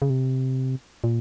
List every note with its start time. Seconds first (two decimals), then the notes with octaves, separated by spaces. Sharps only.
0.02 C#3
0.10 C3
1.04 A#2